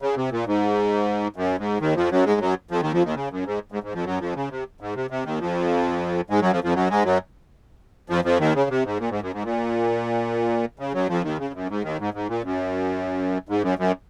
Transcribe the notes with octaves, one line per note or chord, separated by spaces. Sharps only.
C#3
C3
A#2
G#2
F#2
G#2
D#2 D#3
F2 F3
F#2 F#3
G#2 G#3
F#2 F#3
F2 F3
D#2 D#3
F2 F3
D#2 D#3
C#3
F#2
G#2
G#2
G#2
F2 F3
F#2 F#3
F2 F3
C#3
C3
G#2
C3
C3
D#2 D#3
F2 F3
G#2 G#3
F#2 F#3
F2 F3
F2 F3
F#2 F#3
G#2 G#3
F#2 F#3
F2 F3
F2 F3
D#2 D#3
C#3
C3
G#2
A#2
G#2
F#2
G#2
A#2
C#3
F#2 F#3
F2 F3
D#2 D#3
C#3
F#2
G#2
D#2 D#3
G#2
G#2
A#2
F#2
G#2
F#2
F#2